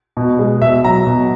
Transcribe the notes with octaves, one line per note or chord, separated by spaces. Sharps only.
B2
G#3
B2 E5
F#3 A#5
B2